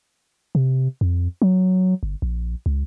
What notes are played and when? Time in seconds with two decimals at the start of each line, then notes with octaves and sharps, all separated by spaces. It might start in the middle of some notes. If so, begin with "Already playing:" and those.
0.55 C3
1.01 F2
1.42 F#3
2.03 G1
2.22 A#1
2.66 C#2